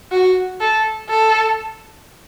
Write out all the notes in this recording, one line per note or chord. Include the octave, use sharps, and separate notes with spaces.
F#4
A4
A4